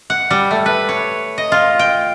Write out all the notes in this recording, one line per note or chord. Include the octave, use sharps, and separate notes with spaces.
F#5
G3
A3
B4
C#5
D#5
F4
G5